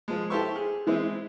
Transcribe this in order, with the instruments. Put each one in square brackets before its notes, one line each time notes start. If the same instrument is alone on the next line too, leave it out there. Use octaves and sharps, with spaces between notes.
[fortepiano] F3 G#3
E4 G4 A4 C5 E5 C#6
G#4
E3 G#3 C4 E4